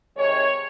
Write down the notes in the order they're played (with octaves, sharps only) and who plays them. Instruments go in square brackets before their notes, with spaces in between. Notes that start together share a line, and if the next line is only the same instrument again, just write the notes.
[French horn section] C3 D#3 G#3 C#5